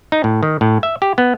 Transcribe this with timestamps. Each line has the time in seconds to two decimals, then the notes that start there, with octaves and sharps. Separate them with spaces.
0.12 D#4
0.24 A2
0.43 D#3
0.61 A2
0.83 E5
1.02 G4
1.18 B3